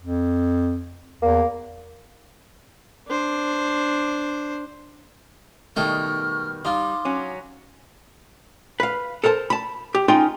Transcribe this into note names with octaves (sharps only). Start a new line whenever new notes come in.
F2
E2 A#3
D4 C5
B2 D#3 G3 A3 D#4 G5 C#6 F6
G3 D#4 F4 C6 D6 F6
F#3 C#4
B4 F5
A4 A#4 C5 A5
A5 B5
G4
C#4 D#4 F4 G#4 G5 C6